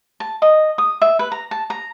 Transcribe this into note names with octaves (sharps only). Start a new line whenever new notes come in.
A5
D#5
D#6
E5
B4
A#5
A5
A#5